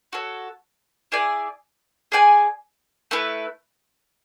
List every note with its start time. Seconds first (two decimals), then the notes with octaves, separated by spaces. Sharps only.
0.13 F#4 A4 C#5
1.12 E4 G#4 D5 G#5
2.12 G#4 D5 G#5
3.11 A3 E4 B4